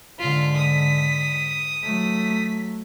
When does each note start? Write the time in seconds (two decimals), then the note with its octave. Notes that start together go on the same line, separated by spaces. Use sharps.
0.19 G#2 D3 F4 B6
0.56 D#6
1.83 F#3 A3 B6